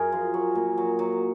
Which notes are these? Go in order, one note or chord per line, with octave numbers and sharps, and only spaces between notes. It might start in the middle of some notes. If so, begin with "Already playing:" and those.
Already playing: F#2 G#4 A#4
F3
F#3
A#2
F#3
F#3